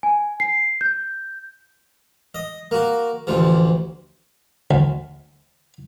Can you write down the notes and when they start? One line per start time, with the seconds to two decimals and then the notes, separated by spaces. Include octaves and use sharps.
0.03 G#5
0.40 C7
0.81 G6
2.35 D#5
2.71 A#3 F#4
3.27 A1 D2 F3
4.71 D2